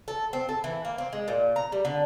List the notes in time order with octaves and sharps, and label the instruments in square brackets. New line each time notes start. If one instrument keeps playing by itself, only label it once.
[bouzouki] A4
C4
A4
E3
A#3
C4
G#3
A#2
A#5
G3
D3